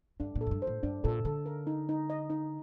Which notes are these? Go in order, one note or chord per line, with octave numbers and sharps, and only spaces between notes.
G2 D4
A#2
A4
F#2
G2
C5
A2
G2 D4
A#2 A4
D3 A4
A#4
D#4
D#4
D#5
D#4